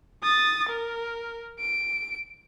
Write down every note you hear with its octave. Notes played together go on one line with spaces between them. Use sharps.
D#6 A6
A#4
D7